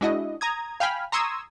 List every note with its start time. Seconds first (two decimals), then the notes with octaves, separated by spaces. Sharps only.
0.01 G#3 D4 E4 F#4 D#5
0.41 A#5 D#6 G#6
0.80 F5 G5 G#5 B5 F6
1.12 A#5 C6 C#6 D#6 E6 G#6